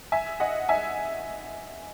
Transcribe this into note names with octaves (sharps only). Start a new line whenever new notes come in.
E5 G#5
D#5 F#5
E5 G#5